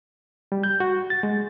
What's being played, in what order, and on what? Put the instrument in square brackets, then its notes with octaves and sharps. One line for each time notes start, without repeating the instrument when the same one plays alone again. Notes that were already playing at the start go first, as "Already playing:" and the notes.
[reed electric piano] G3
G6
F#4
A6
G#3